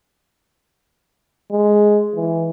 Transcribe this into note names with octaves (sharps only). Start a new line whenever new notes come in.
G#3
E3